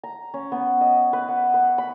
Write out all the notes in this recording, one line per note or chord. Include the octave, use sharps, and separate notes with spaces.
A#5
C#4
B3
D#5
B4
F#5
B4
B5